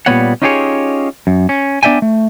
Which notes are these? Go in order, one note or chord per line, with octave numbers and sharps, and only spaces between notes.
A#2 D#3 G3 B3 C#5 F#5
C#4 D#4 F4 G4 G#4 C#5
F#2
C#4
B3 D4 D5 E5 G5 G#5
A3